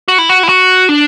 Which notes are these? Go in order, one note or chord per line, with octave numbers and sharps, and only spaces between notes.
F#4
E4
F#4
E4
F#4
D4